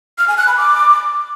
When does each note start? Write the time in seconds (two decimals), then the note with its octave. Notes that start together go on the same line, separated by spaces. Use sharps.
0.18 F6
0.28 G#5
0.38 F#6
0.47 B5
0.57 D6